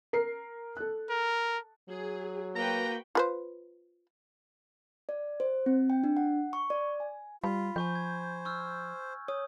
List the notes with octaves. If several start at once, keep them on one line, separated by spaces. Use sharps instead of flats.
A#4 C7
A4 F#6
A#4
F#3 G#4
A#3 F#4 B4 G5 A#5
F4 B4 C5
D5
C5
C4
G5
D4
F#5
C#6
D5
G#5
G3 F4 B5
F3 C5 G#5 C#6 G6
G#6
C#6 E6 F6
C#5 D#6